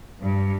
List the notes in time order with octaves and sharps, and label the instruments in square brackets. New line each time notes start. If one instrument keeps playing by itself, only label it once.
[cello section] G2